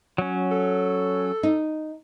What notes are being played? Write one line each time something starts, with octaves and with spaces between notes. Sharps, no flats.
F#3 C#4
A4
D#4